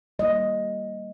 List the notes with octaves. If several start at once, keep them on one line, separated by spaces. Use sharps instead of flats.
D#3 G3 A#3 D#5